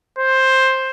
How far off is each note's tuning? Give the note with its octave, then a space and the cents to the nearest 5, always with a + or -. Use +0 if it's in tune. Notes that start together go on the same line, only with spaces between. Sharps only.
C5 +10